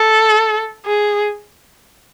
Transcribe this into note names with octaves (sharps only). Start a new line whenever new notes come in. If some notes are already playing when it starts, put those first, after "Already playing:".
Already playing: A4
G#4